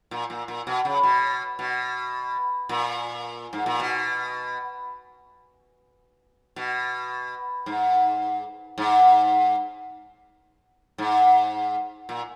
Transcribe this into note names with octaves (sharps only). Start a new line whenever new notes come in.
A#2
A#2
A#2
B2
C#3
B2
B2
A#2
G#2
A#2
B2
B2
G#2
G#2
G#2
A#2